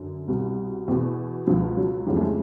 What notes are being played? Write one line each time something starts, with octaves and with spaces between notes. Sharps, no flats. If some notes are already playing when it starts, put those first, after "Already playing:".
Already playing: F#2 D3
C2 B2
E2 B2
C#2 B2 F3
F#3
F2 C#3 E3 G3
A3
G#3